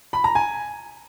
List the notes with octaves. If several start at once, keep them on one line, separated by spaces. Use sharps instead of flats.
B5
A#5
G#5